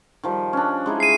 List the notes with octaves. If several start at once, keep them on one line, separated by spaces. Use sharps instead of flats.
D#3 F3 G3
C#4 D4
G#3 D#4 E4
C7 D#7